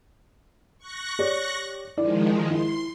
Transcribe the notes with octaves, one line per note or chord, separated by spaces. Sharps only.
C#6 F#6 A#6
G4 C#5 D5
D#3 F3 G#3 E4 D5
E4 C6